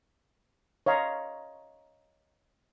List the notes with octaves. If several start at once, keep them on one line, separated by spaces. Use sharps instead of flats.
C#5 D#5 F5 A#5 C6